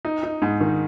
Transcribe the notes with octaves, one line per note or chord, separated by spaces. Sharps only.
D#4
D#4
G#2
D#3